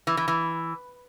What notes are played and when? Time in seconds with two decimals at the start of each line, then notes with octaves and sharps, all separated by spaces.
0.07 E3
0.17 E3
0.28 E3